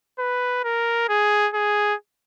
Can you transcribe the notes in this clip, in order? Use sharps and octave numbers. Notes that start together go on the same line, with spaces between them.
B4
A#4
G#4
G#4